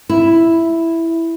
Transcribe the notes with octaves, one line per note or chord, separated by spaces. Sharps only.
E4